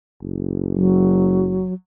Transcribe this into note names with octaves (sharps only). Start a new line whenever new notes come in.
F#1
F#3